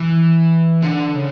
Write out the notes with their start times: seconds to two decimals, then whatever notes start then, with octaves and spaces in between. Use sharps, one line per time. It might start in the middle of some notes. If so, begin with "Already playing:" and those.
Already playing: E3
0.82 D3
1.15 C#3